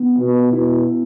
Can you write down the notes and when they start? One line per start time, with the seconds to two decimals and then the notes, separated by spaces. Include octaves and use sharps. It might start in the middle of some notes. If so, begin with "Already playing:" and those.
Already playing: B3
0.18 B2
0.52 B2 E4